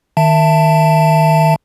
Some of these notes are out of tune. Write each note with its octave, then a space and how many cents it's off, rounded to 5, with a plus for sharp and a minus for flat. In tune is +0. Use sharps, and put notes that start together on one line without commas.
D#3 +0 E5 +15 A5 +15